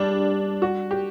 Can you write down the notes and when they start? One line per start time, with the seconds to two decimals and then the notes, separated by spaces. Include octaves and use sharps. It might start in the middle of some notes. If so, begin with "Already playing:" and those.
Already playing: G3 D4
0.62 F#4
0.91 G4